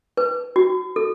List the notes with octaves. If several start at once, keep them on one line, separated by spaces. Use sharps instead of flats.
B4
F#4
A4